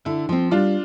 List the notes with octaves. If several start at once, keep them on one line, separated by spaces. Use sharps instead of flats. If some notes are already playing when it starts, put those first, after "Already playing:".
D3 E4
F3 C4
G3 D4 F4